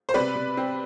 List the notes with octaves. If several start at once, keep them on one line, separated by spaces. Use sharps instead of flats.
C5
C3 B4 D5
C3
C4